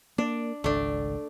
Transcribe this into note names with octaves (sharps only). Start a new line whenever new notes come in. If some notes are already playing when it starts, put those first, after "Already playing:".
A#3 D4
G#1 C#2 A3 D4